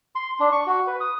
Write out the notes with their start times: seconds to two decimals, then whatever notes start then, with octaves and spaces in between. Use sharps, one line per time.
0.15 C6
0.40 D4
0.52 C#6
0.67 F#4
0.87 B4
1.01 D#6